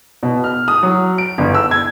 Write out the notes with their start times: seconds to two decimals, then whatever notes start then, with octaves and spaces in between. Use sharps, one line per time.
0.23 B2
0.44 F6
0.68 D#6
0.83 F#3
1.18 D7
1.38 G1
1.54 E6
1.71 G#6